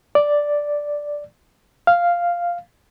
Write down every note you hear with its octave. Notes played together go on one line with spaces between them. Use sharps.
D5
F5